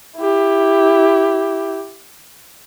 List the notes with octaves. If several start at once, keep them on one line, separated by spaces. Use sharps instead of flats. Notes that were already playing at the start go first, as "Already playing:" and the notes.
E4 G4